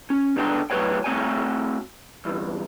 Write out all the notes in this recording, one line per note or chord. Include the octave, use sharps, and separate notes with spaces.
C#4
C#2 D3 B3 D4 F#5 G5
A2 F#3 F#4 B4 C#5 G5
A3 C4 F#4 C#5 G5 G#5
E2 G2